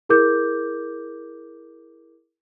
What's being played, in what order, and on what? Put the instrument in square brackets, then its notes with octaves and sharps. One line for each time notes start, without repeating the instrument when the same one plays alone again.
[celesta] E4 G#4 A#4 D6 G6